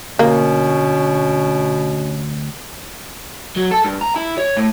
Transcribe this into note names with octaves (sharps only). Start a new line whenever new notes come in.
D2 B2 A#3 C#4
F#3
A4
G2
A#5
E4
C#5
A2